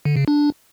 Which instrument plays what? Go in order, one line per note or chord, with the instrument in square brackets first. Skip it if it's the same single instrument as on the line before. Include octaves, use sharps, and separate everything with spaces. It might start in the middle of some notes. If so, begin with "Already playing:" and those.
[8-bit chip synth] D3
C#3
D4